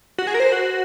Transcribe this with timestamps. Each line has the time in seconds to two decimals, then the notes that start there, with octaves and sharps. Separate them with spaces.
0.18 F#4
0.27 G#4
0.34 A#4
0.40 C5
0.52 F#4